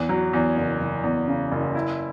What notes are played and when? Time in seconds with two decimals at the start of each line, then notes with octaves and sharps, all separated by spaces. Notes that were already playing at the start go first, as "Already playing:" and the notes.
Already playing: E2
0.09 F#3
0.33 E2
0.56 F#1
0.80 F#1
1.03 E2
1.27 C#3
1.52 F#1
1.75 E4